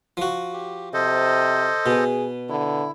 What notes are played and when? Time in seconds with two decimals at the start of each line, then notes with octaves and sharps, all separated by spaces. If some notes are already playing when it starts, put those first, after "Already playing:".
0.17 F3 F#4
0.53 G4
0.93 C3 A4 C5 D#5
1.86 B2 G#4
2.49 D3 E4